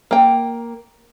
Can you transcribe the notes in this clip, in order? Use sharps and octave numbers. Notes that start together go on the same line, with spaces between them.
A#3 G5